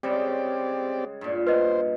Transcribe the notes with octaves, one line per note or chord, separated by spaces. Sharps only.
C#3 G3 G#3 C4 G4 D5
G2 A#2
B4 C5 D#5